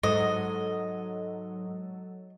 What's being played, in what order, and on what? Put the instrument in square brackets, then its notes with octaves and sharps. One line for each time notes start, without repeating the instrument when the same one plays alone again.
[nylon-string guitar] G#2 [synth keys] F#3 A4 [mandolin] D#5